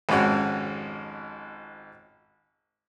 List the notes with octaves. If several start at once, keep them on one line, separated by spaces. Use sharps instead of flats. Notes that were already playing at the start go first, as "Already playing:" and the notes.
G#1 F2 G#2 C#4 F#4